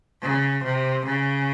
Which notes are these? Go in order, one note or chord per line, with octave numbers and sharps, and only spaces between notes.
C#3
C3
C#3